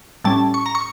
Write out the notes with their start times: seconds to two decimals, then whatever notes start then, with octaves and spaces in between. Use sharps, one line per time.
0.24 A2 G3 C#4 A5
0.54 C#6
0.66 A#5
0.75 C#6